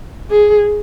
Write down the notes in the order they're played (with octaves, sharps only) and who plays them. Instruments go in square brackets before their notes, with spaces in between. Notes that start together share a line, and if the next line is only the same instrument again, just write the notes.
[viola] G#4